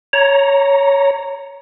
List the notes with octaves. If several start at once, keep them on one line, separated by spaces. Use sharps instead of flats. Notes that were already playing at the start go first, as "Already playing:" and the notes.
C#5 A#5